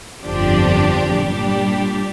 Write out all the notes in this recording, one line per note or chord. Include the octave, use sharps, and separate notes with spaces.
G1 F2 F3 D4 G4
A#2 G3 D4 G4